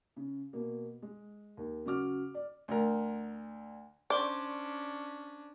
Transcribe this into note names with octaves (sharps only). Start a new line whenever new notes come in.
C#3
B2 A#3
G#3
D#2
C#3 F#3 F#4 D6 F6
D5
D2 A#4
C#4 D4 C5 D5 C6 C#6